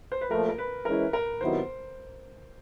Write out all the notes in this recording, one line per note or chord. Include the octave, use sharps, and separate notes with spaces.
C5
B4
A#2 F3 A3 A#4
A#4
B4
E3 G#3 C#4 E4 A#4
A#4
C3 D#3 F#3 B3 E4 C5